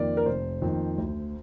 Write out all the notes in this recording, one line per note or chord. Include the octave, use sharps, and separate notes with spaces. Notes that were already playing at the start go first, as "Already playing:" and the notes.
Already playing: F2 D#3 A#3 D5
A#4
F1 C5
F2 D#3 A#3
D2